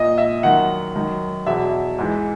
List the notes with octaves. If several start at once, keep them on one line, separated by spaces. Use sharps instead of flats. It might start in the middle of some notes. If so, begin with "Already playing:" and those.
Already playing: A#2 D#5
E5
F#2 D#3 F#5
F#2 D#3
E2 B2 E5
G#2 E3